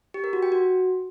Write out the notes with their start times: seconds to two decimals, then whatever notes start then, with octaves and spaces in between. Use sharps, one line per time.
0.14 G4
0.24 A#4
0.33 F#4
0.43 G5
0.52 F#4